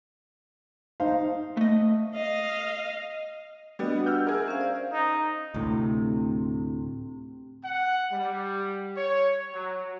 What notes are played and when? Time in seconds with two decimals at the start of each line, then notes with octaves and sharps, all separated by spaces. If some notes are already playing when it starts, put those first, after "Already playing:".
1.00 D#4 C5 F5
1.57 A3 D#5
2.15 D#5 F5
3.79 G3 B3 D4 F#4 D#5
3.93 D4 F#5
4.06 E6 F6 G6
4.27 G#4 A#4 E5
4.48 C#4 C5 F5
4.61 D5
4.93 D#4
5.54 D2 A2 C3
7.63 F#5
8.12 G3
8.97 C#5
9.54 F#3